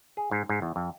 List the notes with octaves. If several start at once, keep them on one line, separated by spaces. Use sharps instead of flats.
G#4
G#2
G#2
E2
F2